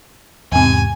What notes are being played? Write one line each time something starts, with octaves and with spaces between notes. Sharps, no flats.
E2 G#2 C3 G#5